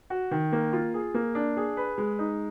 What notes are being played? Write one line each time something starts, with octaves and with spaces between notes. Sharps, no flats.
F#4
D#3
A#3
F4
G#4
A#3
D4
G#4
B4
G#3
D#4